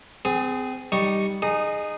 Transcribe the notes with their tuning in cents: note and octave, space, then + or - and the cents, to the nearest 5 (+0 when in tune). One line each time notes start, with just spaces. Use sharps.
C4 -35 G#4 +0
G3 +0 D#4 +0 C#6 +0
D#4 -20 G#4 +0